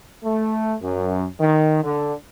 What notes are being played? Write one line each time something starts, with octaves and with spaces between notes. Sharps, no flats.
A3
F#2
D#3
D3